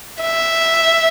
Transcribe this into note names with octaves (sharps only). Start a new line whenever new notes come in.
E5